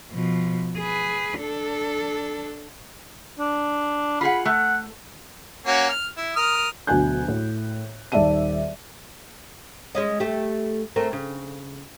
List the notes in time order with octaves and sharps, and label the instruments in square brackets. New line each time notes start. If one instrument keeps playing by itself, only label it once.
[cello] B2 F3
G#4 B4
D4 A4
[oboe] D4
[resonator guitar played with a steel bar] F4 G#4 F#5 [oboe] B5
[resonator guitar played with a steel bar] A3 [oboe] F#5
[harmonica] A#3 C#4 F#4
F6
E4
A#4 D#6 F6
[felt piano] D2 B2 F#3 G#5 F#6 G6
A2
D#1 D#4 D5 E5 A5 D#7
[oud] G#3 C#4 D#5
A3 G4
A3 C4 A#4
C#3